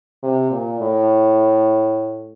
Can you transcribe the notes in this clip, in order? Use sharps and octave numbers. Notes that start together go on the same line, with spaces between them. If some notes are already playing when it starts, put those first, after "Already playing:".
C3
A#2
A2